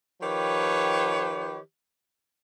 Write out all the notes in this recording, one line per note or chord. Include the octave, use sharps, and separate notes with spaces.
D#3 F3 G4 B4 C#5